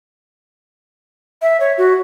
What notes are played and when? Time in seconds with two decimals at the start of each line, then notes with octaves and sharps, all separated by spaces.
1.42 E5
1.60 C#5
1.78 F#4